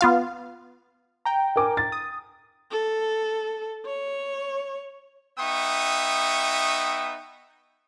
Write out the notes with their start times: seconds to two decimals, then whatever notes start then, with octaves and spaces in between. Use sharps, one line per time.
0.01 B3 F4 F5
1.25 G5 A#5
1.56 A#4 G#5 D6
1.77 A6
1.92 D#6
2.71 A4
3.86 C#5
5.39 B3 D#4 E5 G5 C#6 D#6